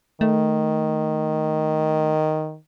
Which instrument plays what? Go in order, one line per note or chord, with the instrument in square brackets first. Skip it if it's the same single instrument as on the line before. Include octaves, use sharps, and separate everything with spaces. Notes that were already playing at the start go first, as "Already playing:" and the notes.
[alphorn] D#3 [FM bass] A3